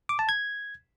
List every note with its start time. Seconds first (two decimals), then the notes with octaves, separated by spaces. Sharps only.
0.09 D6
0.19 A5
0.29 G#6